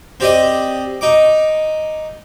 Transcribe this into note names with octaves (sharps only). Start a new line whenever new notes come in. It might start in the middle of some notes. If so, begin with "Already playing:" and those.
C4 G4 D5 D#5
D#4 D6